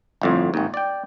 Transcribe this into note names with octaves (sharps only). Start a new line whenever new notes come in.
G1 F2 A2
G#1 D#2
D5 G5